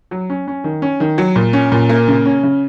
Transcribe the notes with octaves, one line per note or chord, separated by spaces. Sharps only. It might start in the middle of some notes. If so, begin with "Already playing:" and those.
F#3
C#4
C#4
D#3
C#4
D#3
F#3
A#2
C#4
A#2
A#3
C#3
C#4
C#3